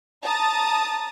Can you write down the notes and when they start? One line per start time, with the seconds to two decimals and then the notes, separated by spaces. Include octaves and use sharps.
0.22 A5 A#5 D#6 A6